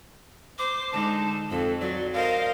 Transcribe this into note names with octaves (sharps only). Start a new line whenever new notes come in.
C5 D6
D3 G#3 D#4 A5
F2 A4
F#3 D5
A#4 C5 D#5 F5